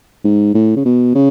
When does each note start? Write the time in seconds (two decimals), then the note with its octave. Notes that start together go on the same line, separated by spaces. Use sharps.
0.25 G#2
0.55 A2
0.76 C#3
0.86 B2
1.15 C#3